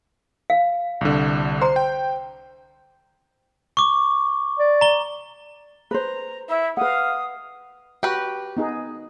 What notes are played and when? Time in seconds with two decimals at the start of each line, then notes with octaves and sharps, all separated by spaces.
0.50 F5
1.01 C2 D3
1.62 C5 A#5 C6
1.76 G5
3.77 C#6 D6
4.59 D5
4.81 A#5 G7
5.91 B4 C5 A#5
6.49 E4 E5
6.77 B4 F5 F#5 D#6
8.03 F#4 G4 B4
8.57 B3 D#4 G#4